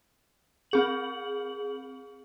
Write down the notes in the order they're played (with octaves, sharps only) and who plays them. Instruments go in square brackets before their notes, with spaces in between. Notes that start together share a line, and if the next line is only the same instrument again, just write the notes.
[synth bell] C4 G#4 F#7